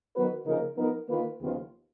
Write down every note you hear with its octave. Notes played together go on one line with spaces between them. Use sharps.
D#3 F#3 B3 F#4 B4
C#3 F3 A#3 D#4 A#4
F3 B3 D#4 A#4
D#3 A#3 F4 B4
D#2 C#3 F3 B3 F4